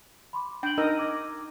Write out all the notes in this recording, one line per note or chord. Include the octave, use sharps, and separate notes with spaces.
B5 C6 D6
D4 G5 F#7
D#4 A#4 D#5 E6
D6 G#6